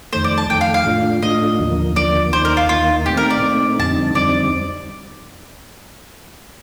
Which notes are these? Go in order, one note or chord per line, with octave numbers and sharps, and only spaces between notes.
F2 D#3 A3 C5
D5
A5
F2 D#3 A3 G5
F5
F5
A2 A3 D4 F4
A2 A3 D4 F4 D#5
D#2 D3 F3 A#3
D#2 D3 F3 A#3 D5
D#2 D#3 A#3 D#4 C5
A#4
F4
D#2 D#3 A#3 D#4 F4
A#2 A3 C4 D#4 G4
A#4
D5
A#2 A3 C4 D#4
F2 D3 G3 C4 D#4 A5
F2 D3 G3 C4 D#4 D5